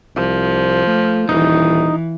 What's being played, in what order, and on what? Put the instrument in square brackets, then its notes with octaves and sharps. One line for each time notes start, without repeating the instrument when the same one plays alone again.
[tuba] C2 [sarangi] F3
[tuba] A3
[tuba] D#1 [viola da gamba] E3 [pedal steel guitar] D#4